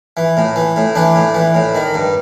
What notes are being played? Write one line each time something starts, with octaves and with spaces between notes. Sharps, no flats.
E3
A2
E3
A2
E3 D4
A2
E3
A2
D#3
G2